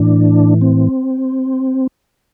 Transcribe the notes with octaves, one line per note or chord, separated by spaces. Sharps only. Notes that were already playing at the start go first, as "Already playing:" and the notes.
Already playing: A2 E3 D4
C4